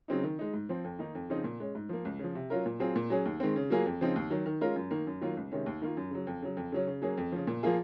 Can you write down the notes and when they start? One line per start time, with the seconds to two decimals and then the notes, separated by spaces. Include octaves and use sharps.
0.08 C#3 F#3 C4 D#4
0.23 D#3
0.39 G#3 D#4
0.53 G#2
0.69 F3 C4
0.84 F2
0.99 D#3 A#3 D#4
1.15 F2
1.30 C#3 F3 C4 D#4
1.44 A#2
1.60 G#3 C#4
1.75 G#2
1.89 F3 A#3
2.05 C#2
2.19 C#3 F3
2.35 C3
2.50 F#3 C#4 F4 A#4
2.66 A#2
2.80 F#3 C4 F4 G#4
2.96 A#2
3.10 F#3 C#4 G#4
3.25 D#2
3.40 D#3 G#3 C4
3.56 C#3
3.70 F#3 A#3 F4 G#4
3.86 F2
4.01 C#3 F3 C4 D#4
4.16 D#2
4.30 D#3 F#3
4.46 D#3
4.61 G#3 C#4 F4 A#4
4.76 F#2
4.91 D#3 A#3
5.07 F#2
5.21 D#3 F#3 A#3 F4
5.37 C#2
5.52 C3 D#3 G#3 C#4
5.66 D#2
5.82 D#3 A#3 F4
5.97 F#2
6.11 C#3 F#3
6.27 F2
6.42 C#3 F#3
6.57 F2
6.72 C#3 F#3 C#4
6.87 C#3
7.02 F#3 A#3 C#4 G#4
7.17 F2
7.32 C#3 F3
7.47 A#2
7.63 F3 A#3 F4 G#4